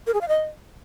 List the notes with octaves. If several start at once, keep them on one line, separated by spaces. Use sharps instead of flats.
A#4
G#4
F5
D#5